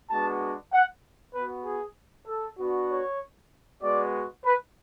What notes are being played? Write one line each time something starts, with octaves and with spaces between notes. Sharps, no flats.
G#3 B3 D4 F#4 A5
F#5
B3 F#4 B4
G#4
A4
B3 D4 F#4
C#5
G#3 B3 F#4 D5
B4